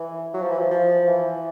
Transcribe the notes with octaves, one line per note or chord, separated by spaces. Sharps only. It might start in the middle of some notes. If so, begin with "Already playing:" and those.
Already playing: E3
F#3
F3
E3
F3
F3
E3